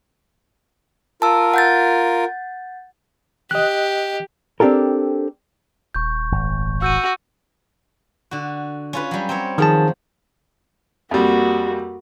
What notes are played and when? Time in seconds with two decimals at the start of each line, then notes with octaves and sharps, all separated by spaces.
1.22 F4 A#4 A5 E6
1.54 F#5 G6 A6
3.51 G4 D#5 F#6
4.60 C4 D4 G4 A4 A#4
5.95 D#1 C#6 G6
6.32 G#1
6.82 F#4 E6 G6 D#7
8.31 D3 F#4
8.93 C#4 F4 B4
9.11 F#3 G3
9.29 C4 A#4 C#5
9.58 D#3 F3 F#3 G#4 A5
11.11 F2 G3 A#3 F#4